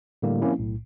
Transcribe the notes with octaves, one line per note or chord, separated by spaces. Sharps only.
A2 D3 G3 A#3 G4
F3 A#3 C4 C#4 E4
B1 A2